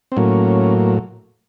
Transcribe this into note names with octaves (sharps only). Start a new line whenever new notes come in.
C4
A2 F#3 A#3 C#4